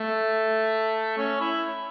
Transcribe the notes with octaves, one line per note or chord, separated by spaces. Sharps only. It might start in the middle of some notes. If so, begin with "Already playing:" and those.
Already playing: A3
C#4
E4